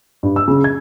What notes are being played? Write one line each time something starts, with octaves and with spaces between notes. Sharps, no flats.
G2
E6
C#3
G#6